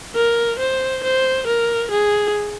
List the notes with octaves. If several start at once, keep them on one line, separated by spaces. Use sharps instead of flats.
A#4
C5
C5
A#4
G#4